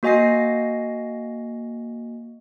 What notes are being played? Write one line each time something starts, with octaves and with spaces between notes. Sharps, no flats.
A#3 F#4 D#5 G#5 A#6 C7